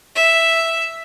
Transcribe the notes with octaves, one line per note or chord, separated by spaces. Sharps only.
E5